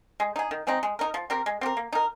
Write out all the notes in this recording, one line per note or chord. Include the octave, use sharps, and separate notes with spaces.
G#3
D#4 G#4
D#3
G#3 C4 D#4
G#3
D#4 A#4
F3
C4 G4 A#4
G#3
C4 G4 A#4
A#3
D#4 A#4